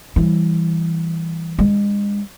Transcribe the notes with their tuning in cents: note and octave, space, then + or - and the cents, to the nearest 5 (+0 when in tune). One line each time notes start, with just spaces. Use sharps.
E3 +0 G3 +0
G#3 -35 D4 +0